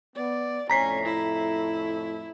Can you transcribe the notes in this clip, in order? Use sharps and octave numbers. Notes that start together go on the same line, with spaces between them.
B3 D5
F2 A2 A3 C#4 A#5 B6 C7
E4